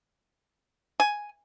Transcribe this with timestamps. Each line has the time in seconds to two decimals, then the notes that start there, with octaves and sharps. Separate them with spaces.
1.00 G#5